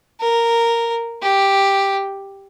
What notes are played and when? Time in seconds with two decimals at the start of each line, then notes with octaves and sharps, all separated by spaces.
0.21 A#4
1.23 G4